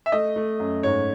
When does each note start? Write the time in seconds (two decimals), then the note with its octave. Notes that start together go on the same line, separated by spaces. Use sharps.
0.06 E5
0.12 A3 D#5
0.36 A3
0.60 F#2
0.83 G#2 C#5